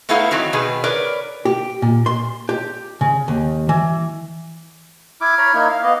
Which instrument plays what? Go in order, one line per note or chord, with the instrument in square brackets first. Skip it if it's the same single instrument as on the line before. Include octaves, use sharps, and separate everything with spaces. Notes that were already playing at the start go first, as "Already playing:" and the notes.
[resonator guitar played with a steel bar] A3 B3 D#4 E4 A4 F5
D#3 E3 F#3 C4
B2 D#3 G#4 B4
A#4 B4 C#5 D5
[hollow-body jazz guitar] G4
A#2
C6
G4
C#3
D#2
E3
[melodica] E4 D6 [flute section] F6 G#6
[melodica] C#5 A#5 B5
A#3 D#4 E4
F5
[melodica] B3 D#5 [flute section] F5 D6